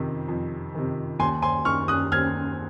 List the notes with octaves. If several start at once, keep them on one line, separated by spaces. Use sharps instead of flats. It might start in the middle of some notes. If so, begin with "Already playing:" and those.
Already playing: F2 C3 D#3
F2
C3 D#3
D#2 G#5 C6
G#5 C6
D#3 C#6 F6
D#6 F#6
D#2 F6 G#6